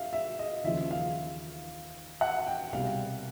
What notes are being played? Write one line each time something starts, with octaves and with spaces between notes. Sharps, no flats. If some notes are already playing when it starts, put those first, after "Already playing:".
Already playing: E5 F5
E5
D#5
D#2 C#3 F3 E5
F5
F#5
G5
C2 B2 G3 F5